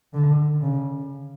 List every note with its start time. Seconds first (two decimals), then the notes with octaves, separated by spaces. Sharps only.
0.14 D3
0.62 C#3